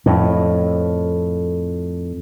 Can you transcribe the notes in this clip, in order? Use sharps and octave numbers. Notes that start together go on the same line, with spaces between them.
F2 A2